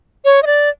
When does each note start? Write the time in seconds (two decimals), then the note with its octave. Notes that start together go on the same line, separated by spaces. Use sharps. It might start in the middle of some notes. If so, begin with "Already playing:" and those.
0.25 C#5
0.42 D#5
0.46 D5